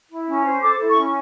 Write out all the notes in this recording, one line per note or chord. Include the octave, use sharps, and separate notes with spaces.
E4
C#4
C5
A4 D6
E4
C#6
C#4